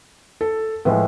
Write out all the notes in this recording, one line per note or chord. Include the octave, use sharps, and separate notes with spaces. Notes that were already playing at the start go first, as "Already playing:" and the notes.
A4
A2 F3 G#3 B4